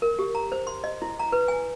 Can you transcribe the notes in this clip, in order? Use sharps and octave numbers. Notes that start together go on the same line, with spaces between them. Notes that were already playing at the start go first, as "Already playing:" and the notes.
A#4
G4
A#5
C5
C6
D#5
E4
A#5
B4
G#5